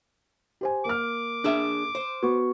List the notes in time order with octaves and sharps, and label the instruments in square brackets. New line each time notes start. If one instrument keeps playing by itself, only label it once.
[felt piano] G4 C5 G#5
[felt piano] A#3 F6 [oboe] D6
[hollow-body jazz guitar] D4 G#4 E5
C5
[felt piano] B3 [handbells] F#4 C#6